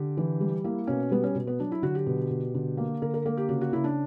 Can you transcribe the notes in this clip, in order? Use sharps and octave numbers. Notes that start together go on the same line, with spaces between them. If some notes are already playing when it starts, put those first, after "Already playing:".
Already playing: D3 G4
E3
G3
A#3 E4
B2 C#4
G3 B3
C#4
B2
B3
F#3 D4
E4
D3 F#4
G4
B2
B2
D3
A#3
D3 A#4
A#4
A#3 A#4
G4
C#3 F#4
F#4
C#3 E4
D4